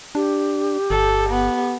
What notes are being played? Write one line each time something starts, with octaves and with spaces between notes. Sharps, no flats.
D4 G4
G1 A4
B3